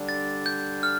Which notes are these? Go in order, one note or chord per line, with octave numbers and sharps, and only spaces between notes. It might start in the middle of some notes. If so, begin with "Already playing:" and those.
Already playing: D3 G3 D4
A6
G6
F6